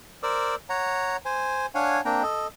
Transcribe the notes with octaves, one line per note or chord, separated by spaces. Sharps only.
A#4 C5 D5 D6 E6
C#5 F#5 A#5
C5 G#5
D4 C#5 F5 F#5 G#5
A#3 C4 D4 G5 A#5
A4 D#5